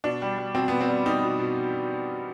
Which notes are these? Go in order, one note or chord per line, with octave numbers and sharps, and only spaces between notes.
B2 D4
G3
G3
B2 C4
B2 B3
C4
G3
G3 D#4
B2
B2